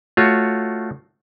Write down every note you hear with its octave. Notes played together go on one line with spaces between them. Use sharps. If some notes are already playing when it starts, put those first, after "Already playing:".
A3 F4 F#4 C#5